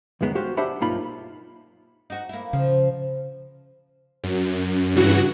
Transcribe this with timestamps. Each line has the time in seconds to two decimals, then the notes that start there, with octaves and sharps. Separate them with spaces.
0.21 C#2 F#2 D#3 G#3 B3
0.35 F#4 G4 C5 F5
0.57 D4 G4 C5 E5 F#5 B5
0.81 B1 G2 A#3 D#4 F4 B5
2.10 D#4 F#4
2.29 A#3 E4
2.53 C#3 F3
4.24 F#2
4.95 G2 C#3 E3 F#4